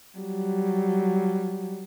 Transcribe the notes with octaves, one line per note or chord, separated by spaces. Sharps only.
F#3 G3